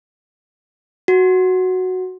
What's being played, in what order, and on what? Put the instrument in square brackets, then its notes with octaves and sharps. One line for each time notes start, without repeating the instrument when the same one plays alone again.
[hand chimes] F#4